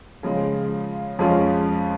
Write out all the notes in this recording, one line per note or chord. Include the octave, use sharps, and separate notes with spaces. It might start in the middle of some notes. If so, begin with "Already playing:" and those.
C#3 F3 G#3
F2 F3 G#3 C#4 F4